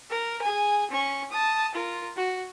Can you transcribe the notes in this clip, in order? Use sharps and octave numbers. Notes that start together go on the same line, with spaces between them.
A#4
G#4 G#5
C#4 C#6
A5 D#6
F4 A#4
F#4